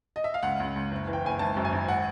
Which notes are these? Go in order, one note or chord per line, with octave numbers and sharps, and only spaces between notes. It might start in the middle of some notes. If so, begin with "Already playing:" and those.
D#5
E5
F5
C#2 F#5
C#2
C#2
F#1
E3
G5
F#1 G#5
G#1 A5
F#2
G#5
G#1
F#5